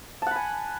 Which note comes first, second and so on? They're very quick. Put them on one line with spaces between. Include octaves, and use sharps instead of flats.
A5 F#5 B5 G#5